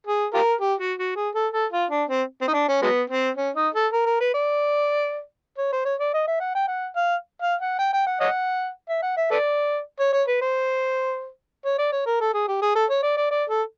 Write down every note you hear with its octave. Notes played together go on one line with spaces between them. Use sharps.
G#4
F4 G4 A#4
G4
F#4
F#4
G#4
A4
A4
F4
D4
C4
C4
D#4
D4
C#4
F#3 G#3 B3
C4
C#4
D#4
A4
A#4
A#4
B4
D5
C#5
C5
C#5
D5
D#5
E5
F#5
G5
F#5
F5
F5
F#5
G5
G5
F#5
C#5 D#5 F#5
E5
F#5
E5
A4 B4 D5
C#5
C#5
B4
C5
C#5
D5
C#5
A#4
A4
G#4
G4
G#4
A4
C#5
D5
D5
D5
A4